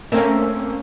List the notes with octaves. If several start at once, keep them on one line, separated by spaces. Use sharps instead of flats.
A3 A#3 C4 C#4 A#4 E5